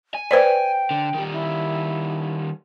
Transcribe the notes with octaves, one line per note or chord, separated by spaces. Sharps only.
G#5
B4 C5 D5 G5
D3
D#3 G3
E4